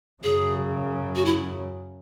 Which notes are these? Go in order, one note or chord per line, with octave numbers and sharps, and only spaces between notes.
F#2 C#3 F#3 G#4
F#4
E4